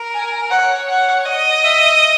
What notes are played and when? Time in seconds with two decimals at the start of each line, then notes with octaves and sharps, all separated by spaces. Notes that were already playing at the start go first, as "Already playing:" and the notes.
Already playing: A#4
0.14 G#5
0.51 C#5 F#5
0.89 F#5
1.25 D#5
1.63 E5